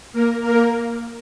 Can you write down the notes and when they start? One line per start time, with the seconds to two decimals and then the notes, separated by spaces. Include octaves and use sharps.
0.13 A#3 A#4
0.41 A#3 A#4